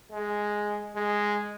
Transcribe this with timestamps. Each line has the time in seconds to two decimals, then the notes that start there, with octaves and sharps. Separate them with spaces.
0.12 G#3
0.96 G#3